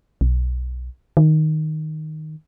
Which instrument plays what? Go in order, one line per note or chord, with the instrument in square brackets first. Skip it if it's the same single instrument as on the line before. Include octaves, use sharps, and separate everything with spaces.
[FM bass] B1
D#3